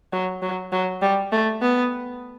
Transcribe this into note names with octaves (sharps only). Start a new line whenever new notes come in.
F#3
F#3
F#3
G3
A3
B3